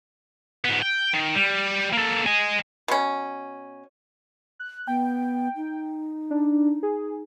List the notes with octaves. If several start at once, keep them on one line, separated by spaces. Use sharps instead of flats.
G#2 B3
G5
D#3
G3
A#3 A4
D#5 G#5
B2 C#4
F#6
B3 G5
D#4
D4
G#4